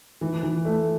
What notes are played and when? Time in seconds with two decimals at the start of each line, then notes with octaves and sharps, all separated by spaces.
0.21 E3
0.43 E3
0.65 A3